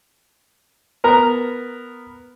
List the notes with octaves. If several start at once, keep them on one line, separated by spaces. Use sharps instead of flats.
B3 A#4 A#5